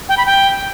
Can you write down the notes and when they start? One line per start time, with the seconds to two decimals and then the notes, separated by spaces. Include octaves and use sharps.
0.09 G5
0.17 B5
0.26 G5